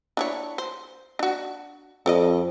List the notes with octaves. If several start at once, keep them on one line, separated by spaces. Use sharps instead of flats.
D4 E4 C#5
C5
D4 F#4
F2 A4 D5 D#5